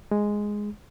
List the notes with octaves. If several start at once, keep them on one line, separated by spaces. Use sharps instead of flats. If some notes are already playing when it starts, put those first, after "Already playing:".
G#3